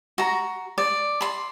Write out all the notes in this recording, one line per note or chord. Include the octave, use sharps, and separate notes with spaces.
F#4 A#5
D5
B5 C6